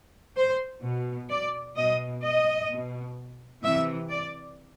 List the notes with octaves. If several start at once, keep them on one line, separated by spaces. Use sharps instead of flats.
C5
B2
D5
B2 D#5
D#5
B2
C3 E3 E5
D5